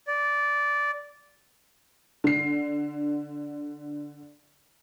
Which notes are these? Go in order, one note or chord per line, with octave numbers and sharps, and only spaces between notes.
D5
D3 C7